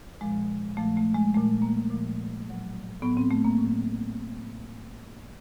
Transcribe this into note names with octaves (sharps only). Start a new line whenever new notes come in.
A#2 F3 G#3
A#2 F3 A3
A3
G#3
A#2 F3 A3
A#3
A#2 F3
A2 F#3
A2 F#3 B3
C4
A3
A#3
A2 F#3